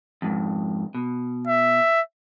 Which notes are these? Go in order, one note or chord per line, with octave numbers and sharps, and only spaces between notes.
F2 G#2
B2
E5